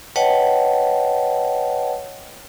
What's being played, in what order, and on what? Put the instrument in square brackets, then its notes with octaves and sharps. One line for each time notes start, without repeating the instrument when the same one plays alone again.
[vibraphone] B4 C#5 D#5 F#5 G5 A5